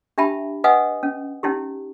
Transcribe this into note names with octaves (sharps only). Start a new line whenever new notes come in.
D4 G4 E5 G5 A5 B5
B4 D#5 F5 F#5 G#5 D#6
C#4
C#4 D#4 E4 G4